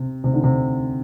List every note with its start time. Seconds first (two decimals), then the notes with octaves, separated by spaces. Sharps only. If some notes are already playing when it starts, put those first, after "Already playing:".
Already playing: C3
0.24 C3
0.34 D3
0.44 C3